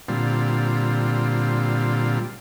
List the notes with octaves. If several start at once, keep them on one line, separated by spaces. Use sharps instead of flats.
A#2 D3 G3 C4 F4